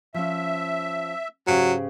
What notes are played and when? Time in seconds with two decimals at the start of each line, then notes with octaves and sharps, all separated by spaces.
0.14 F3 C#4 E5
1.47 G#2 C#3 F#3 G4